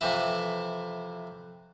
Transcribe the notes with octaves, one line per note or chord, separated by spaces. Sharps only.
F2 C3 E3 E4